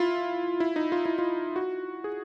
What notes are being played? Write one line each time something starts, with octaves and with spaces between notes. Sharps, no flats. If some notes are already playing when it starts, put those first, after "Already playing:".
Already playing: E4 F4
E4
D#4
F4
E4
F4
F#4
G#4